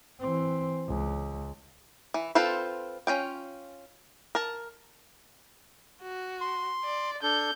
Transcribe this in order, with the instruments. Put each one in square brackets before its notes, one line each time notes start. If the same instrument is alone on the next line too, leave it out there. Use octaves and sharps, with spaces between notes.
[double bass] E3 C4
C#2
[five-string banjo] E3
C4 F4 A4 B4 C5
C#4 F4 G5
A#4 A5
[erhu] F#4
[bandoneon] C6
[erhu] D5
[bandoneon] D4 A4 [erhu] G6